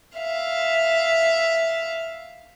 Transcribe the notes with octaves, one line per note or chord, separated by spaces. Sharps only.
E5 F5